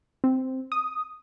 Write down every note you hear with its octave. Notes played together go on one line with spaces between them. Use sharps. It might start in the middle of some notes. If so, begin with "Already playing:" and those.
C4
D#6